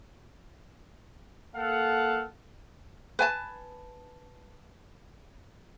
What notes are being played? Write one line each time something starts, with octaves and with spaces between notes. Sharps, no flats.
A#3 A4 F5 F#5
B4 G#5 A5